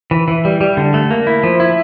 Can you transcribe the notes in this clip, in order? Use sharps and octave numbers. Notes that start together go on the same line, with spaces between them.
E3
E3
G3
G3
D3
A3
A#3
E4
F3
E4